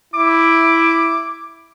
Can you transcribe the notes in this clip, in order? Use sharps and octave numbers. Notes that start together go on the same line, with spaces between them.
E4 D6